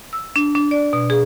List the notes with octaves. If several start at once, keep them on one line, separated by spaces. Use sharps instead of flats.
E6
D4
D4
D5
B2
G#4